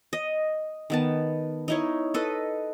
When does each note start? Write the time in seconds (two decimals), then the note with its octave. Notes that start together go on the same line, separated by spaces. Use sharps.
0.13 D#5
0.90 D#3 B3 A5
1.68 D#4 E4 C#5
2.14 A4 B4 D#5